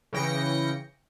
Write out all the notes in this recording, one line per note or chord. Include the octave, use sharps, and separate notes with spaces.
C#3 E3 G5 A#6 C#7